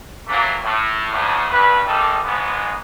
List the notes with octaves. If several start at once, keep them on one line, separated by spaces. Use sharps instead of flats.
E3 F#3 A3 A#3
A2
D2 A2
A#1 G2 B4
G#1 D#3 G3 G4 A4
G#1 G#2 B3